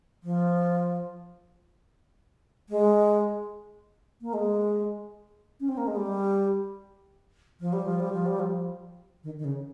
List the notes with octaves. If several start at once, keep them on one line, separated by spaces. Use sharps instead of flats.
F3
G#3
A#3
G#3
C#4
C4
A#3
G#3
G3
F3
G3
F3
G3
F3
G3
F3
D#3
D#3
C#3